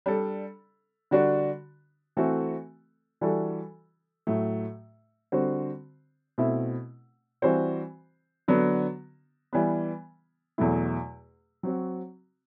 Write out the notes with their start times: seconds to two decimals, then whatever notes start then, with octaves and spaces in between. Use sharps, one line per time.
0.06 G3 D4 A4
1.11 D3 G3 D4 F#4
2.17 E3 A3 C4 F#4 A4
3.21 E3 G3 D4 F#4 A4
4.27 A2 F#3 A3
5.32 D3 G3 C4 F#4 C5
6.38 B2 A3 C4 E4
7.42 E3 G3 C4 F#4 C5
8.48 D3 F#3 B3 D4
9.53 E3 G3 B3
10.58 E2 B2 F#3 A3 E4
11.63 F#3 C4 F#4